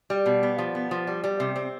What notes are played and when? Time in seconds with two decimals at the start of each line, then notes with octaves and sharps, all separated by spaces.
0.10 G3
0.26 B2
0.43 B3
0.58 F3
0.75 B3
0.91 F3
1.07 G3
1.24 G3
1.40 C3
1.56 C4